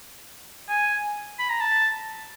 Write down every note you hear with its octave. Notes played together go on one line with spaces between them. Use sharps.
G#5
B5
A#5
A5